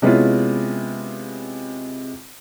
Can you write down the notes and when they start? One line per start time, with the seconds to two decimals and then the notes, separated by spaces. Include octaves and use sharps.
0.02 C3 G#3 B3 C#4 E4 F4